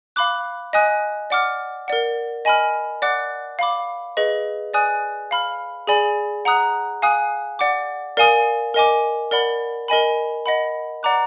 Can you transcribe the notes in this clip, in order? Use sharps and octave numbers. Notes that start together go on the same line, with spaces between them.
F5 B5 D6 F#6
D#5 G#5 D#6 F#6
D5 F#5 D6 F6
A#4 D5 F#5
D#5 G#5 B5 F6
D5 F#5 D6 F#6
F5 B5 D6
G#4 B4 D#5
D5 G#5 D#6 F#6
F5 B5 F6
G#4 D5 G#5 B5
F#5 A#5 D#6 F#6
F5 G#5 D#6 F#6
D5 F#5 D6
A#4 D5 F5 G#5 D#6
A#4 D#5 G#5 D6
A#4 D5 F#5 B5
A#4 D#5 G#5 B5
D#5 F#5 B5
D5 F#5 A#5 D6 F#6